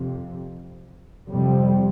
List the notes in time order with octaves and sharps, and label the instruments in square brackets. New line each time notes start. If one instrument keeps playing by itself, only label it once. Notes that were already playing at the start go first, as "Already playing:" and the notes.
Already playing: [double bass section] F2 C3
F2 C3 G3